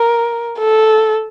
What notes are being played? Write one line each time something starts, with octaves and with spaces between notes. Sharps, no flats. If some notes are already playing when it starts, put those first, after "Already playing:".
Already playing: A#4
A4